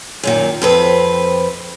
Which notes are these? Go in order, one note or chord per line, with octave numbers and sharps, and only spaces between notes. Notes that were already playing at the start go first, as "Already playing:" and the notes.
F#2 A#2 D#3
F2 C4 B4